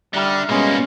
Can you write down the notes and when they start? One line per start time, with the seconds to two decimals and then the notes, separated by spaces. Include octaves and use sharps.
0.14 D3 G3 E5 A#5 F6
0.49 B2 G3 G#3 A#3 B3 C#4